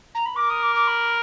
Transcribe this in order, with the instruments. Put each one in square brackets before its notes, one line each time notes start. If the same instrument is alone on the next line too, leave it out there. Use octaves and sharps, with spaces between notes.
[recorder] A#5
B5
[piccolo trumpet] A#4 [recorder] D6
[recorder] D#6
D6
D6
B5